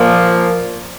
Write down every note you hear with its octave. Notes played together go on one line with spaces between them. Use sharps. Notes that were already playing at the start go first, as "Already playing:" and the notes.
Already playing: A#2 F3 A#3